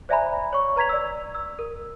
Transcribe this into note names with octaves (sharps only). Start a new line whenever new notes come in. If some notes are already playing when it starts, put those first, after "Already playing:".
C5 D5 E5 G#5 A#5 B5
C#5 C#6
B4 A#5 G#6 B6 F7
D5 E6
E6
A#4